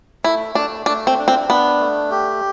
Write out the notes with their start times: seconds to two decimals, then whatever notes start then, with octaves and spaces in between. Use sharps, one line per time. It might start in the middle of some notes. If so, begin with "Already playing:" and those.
0.24 A3 E4
0.55 A3 D4
0.86 A3 D4
1.07 C4
1.18 D4
1.28 C4
1.49 B3 D4
1.80 A3
2.11 G4